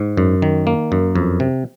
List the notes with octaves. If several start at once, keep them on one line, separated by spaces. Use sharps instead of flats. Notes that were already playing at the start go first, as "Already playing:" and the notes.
Already playing: G#2
F#2
D#3
A#3
F#2
F2
C3